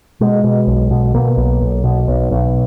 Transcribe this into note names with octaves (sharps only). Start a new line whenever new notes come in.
B2 G#3
B2
B1
B2
B2 A#3
B1
B1
B2
B1
B1